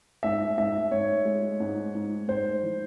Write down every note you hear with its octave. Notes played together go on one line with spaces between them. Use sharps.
G#2 E5
G#2 E5
G#2 C#5
G#3
G#2
G#2
G#2 C5
E3